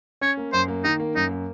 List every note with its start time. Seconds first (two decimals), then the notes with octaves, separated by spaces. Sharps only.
0.21 C#4 C#5
0.37 A#3
0.53 F#2 C5
0.68 A#3
0.84 D#3 D#4
1.00 A#3
1.15 F#2 D#4
1.31 A#3